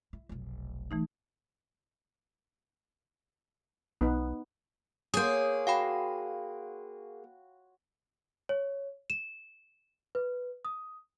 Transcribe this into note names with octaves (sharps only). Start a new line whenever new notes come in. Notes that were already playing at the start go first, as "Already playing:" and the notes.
E4
F1 B1
E3 A3 D#4
B1 B3 D#4
A#3 G#4 C#5 F#5 C6 D#6 G6
F#4 F5 G5 B5
C#5
E7
B4
D#6